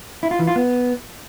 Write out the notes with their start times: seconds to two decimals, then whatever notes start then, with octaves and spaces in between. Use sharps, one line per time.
0.23 E4
0.31 F4
0.39 E3
0.47 F4
0.56 B3